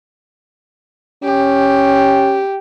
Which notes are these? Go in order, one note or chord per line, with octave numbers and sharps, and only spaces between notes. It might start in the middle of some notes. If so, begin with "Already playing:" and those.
C#4 G4